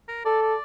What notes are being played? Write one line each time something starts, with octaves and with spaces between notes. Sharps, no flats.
A#4
A4 D5
D5